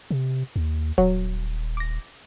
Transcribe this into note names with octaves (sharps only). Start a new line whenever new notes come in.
C3
D#2
D#1 F#3
D6 A#6